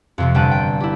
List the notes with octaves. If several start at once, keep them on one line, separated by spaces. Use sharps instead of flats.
F2 C3 F3
G1 G3 G5 A5 F#6 D#7
G5
E4 G4